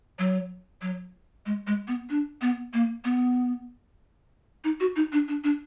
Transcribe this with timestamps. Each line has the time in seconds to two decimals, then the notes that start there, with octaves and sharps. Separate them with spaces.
0.19 F#3
0.82 F#3
1.46 G#3
1.67 G#3
1.88 B3
2.10 D4
2.41 B3
2.73 A#3
3.05 B3
4.64 D#4
4.80 F#4
4.96 D#4
5.12 D4
5.28 D4
5.44 D4